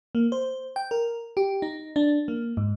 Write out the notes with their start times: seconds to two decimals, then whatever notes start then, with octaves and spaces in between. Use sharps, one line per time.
0.15 A#3
0.32 C5
0.76 G5
0.91 A#4
1.37 G4
1.62 D#4
1.96 D4
2.28 A#3
2.57 G#2